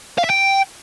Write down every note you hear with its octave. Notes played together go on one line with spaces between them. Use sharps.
F5
E5
G5